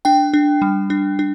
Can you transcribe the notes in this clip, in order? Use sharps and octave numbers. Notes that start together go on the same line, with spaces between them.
D4 G5
D4
G3
D4
D4